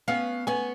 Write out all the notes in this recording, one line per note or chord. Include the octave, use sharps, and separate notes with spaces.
B3 C#4 F5
B3 C#4 G#5